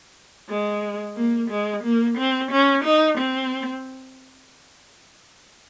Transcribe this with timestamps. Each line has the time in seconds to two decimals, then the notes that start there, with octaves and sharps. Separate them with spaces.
0.50 G#3
1.17 A#3
1.51 G#3
1.84 A#3
2.18 C4
2.52 C#4
2.85 D#4
3.18 C4